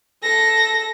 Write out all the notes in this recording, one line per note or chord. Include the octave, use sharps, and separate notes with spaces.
A4 A#6